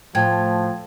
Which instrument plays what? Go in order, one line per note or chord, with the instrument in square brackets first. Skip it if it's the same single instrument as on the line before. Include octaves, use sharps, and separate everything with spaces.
[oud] A2 [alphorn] F3 [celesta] G5 G#6